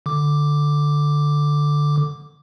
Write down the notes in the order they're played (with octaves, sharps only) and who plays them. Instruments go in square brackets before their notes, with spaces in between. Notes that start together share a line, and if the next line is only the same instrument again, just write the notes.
[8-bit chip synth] D3 D6